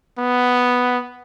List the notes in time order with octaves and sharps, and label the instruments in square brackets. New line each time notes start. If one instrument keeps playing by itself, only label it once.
[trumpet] B3